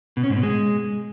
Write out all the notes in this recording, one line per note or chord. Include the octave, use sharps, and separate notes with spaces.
B2
C#4
G#2
B2
G#3